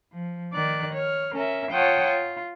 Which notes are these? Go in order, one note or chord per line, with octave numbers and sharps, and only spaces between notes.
F3
D#3 D5 F#6
C#5 F6
C#4 A#4 E5
F4 C#5 F#5 G5 A5 D#6
F4